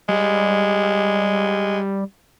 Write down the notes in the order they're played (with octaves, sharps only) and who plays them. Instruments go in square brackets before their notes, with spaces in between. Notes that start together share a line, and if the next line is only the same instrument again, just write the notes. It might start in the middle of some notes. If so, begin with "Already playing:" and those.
[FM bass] G3 [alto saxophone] G#3